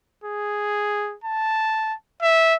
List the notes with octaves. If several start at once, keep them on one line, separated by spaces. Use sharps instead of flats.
G#4
A5
E5